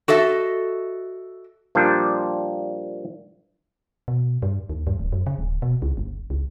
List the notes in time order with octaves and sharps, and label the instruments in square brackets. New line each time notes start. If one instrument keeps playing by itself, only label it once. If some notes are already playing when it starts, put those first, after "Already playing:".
[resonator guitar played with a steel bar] F#4 A4 D#5 E5
[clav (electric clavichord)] A#2 F3 G3 D4
[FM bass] B2
G2
D#2
G2
D1
F#2
C#3
D1
B2
C#2
G1
C#2